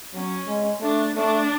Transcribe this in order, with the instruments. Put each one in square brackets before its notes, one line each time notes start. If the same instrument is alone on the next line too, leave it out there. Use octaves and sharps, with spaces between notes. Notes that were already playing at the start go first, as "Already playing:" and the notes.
[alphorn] F#3 [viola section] C#4
[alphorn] G#3
[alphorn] A3 [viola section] D4
[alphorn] A3 [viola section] D4